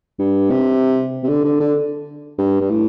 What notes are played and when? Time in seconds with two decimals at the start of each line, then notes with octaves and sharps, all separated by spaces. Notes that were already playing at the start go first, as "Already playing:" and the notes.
0.19 G2
0.51 C3
1.24 C3
1.29 D3
1.44 D3
1.60 D3
2.39 G2
2.61 G2
2.70 A2